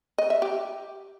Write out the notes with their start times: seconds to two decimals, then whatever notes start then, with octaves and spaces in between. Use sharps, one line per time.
0.18 D#5
0.30 E5
0.42 G4